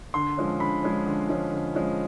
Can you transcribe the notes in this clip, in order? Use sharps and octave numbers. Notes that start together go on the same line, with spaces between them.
D3 C6
F3 G#3 C#4
D3 B5
F3 G#3 C#4
D3
F3 G#3 C#4
D3
F3 G#3 C#4